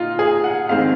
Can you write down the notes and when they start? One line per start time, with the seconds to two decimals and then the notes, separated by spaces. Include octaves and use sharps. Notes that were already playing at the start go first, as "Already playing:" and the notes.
Already playing: A#2 D#4 F4
0.19 G#4
0.44 F#5
0.69 F2 D#3 G#3 C4 F5